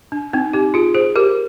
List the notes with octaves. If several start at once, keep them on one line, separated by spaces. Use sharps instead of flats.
D4
C4 D#4
D#4 G4
F4 G#4
G#4 C5
G4 A#4